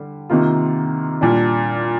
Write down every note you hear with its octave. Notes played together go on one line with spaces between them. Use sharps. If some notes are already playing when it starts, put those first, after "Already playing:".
Already playing: D3 G3
C3 D#3 A#3 F4
A#2 G3 D4